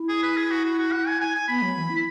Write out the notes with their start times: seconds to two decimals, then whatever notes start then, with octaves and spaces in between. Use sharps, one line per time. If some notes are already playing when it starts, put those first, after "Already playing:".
Already playing: E4
0.09 G#4
0.23 B4
0.37 G#4
0.51 F#4
0.65 F#4
0.79 F#4
0.92 F#5
1.07 G#5
1.21 G#5
1.35 G#5
1.48 B3 B5
1.62 F#3
1.76 E3
1.90 E4